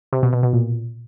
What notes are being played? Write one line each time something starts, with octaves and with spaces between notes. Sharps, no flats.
C3
B2
B2
B2
A#2